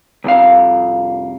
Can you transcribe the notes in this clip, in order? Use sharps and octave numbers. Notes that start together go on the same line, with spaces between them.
C2 F2 F5